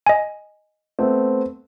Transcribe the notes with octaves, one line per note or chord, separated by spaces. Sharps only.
D#5 G#5
A3 B3 C4